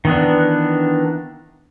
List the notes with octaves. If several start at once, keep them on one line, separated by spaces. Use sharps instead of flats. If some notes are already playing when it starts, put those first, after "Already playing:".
D#3 E3 B3 D4